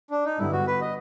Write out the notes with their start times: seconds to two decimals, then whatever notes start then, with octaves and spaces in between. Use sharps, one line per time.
0.11 D4
0.25 D#4
0.38 G2 D3 G3 B3 E4
0.52 F#4
0.67 B4
0.81 D#5